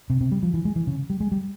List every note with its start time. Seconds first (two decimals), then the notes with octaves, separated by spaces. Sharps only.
0.10 C3
0.21 C3
0.31 G3
0.43 F3
0.54 E3
0.65 G#3
0.76 E3
0.87 C#3
1.10 G3
1.20 G#3
1.32 G3